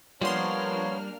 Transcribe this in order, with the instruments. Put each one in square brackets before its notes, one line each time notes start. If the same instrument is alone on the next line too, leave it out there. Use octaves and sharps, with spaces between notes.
[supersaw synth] F3 C6 [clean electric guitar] G3 [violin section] A#3 D4 F6 [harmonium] B3 C#5